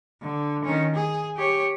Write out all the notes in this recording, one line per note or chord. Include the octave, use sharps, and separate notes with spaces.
D3
D#3 C#4
G#4
G4 C#5